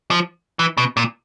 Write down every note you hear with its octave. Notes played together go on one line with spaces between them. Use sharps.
F3
E3
B2
A#2